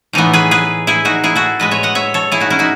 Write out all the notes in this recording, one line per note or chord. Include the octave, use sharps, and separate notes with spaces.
A2 E3 A3 B3 D#4
G#4 B4
G#4 B4
E4 G#4
D#4 F#4
E4 G#4
F#4 A4
A2 G#3 B4 D#5
C#5 E5
D#5 F#5
C#5 E5
A4 C#5
E4 G#4
D#4 F#4
C#4 E4
D#4 F#4